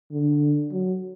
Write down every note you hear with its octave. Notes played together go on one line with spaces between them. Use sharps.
D3
F#3